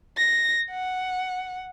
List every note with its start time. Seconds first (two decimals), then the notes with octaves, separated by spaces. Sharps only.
0.17 A#6
0.71 F#5